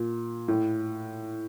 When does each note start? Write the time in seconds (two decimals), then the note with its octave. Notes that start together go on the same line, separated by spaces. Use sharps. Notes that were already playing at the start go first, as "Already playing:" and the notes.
Already playing: A#2
0.48 A2